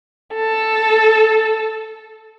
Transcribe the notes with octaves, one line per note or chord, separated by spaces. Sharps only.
A4